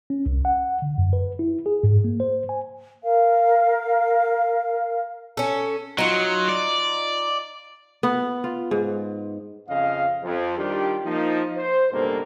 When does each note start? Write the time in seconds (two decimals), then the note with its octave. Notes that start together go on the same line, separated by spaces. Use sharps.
0.10 C#4
0.26 C2
0.45 F#5
0.82 D3
0.98 F#2
1.13 B4
1.39 E4
1.66 G#4
1.83 G#2
2.04 A#3
2.20 C5
2.49 G#5
3.03 A#4 F5
5.37 C#4 A4
5.98 F#3 D#4 F4
6.49 D5
8.03 B3
8.44 F4
8.71 G#2
9.69 F2 C#3 D#5 F5
10.24 F2
10.58 D#3 G3 D4 F4 G4
11.05 F3 A#3 D#4
11.58 C5
11.92 C#2 G2 B2 A#3 A4